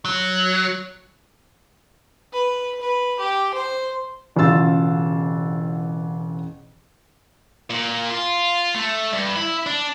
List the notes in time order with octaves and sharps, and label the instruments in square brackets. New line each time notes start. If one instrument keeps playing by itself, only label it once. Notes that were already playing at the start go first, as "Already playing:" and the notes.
[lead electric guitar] F#3
[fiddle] B4
B4
G4
C5
[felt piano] E1 A1 C#3 F4 E6 A6
[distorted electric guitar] A#2
F4
A3
G2
E4
D4